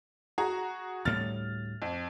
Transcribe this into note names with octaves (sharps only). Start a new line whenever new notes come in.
F#4 G#4 A#5
D2 A2 G3 F6 A6
F2